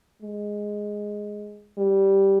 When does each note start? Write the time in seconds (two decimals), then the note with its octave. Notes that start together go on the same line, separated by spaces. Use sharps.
0.22 G#3
1.78 G3